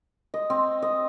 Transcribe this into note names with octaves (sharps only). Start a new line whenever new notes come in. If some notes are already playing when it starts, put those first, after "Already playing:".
D#5
C4
D#5